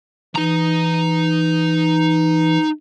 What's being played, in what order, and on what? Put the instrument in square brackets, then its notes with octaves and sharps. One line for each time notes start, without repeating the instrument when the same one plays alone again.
[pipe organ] E3 [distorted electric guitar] D#4 A#5